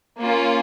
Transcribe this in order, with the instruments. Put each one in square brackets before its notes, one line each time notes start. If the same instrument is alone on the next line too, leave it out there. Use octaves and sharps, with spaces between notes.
[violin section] A#3 C#4 F4